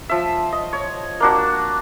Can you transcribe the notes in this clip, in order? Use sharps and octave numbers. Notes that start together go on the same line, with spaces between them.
F3 E5
D#5
C#5
A#3 D4 F#4